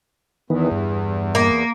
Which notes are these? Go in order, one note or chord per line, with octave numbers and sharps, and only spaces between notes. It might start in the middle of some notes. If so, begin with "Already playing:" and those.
E2 D#3 E3 B3
G2
A#3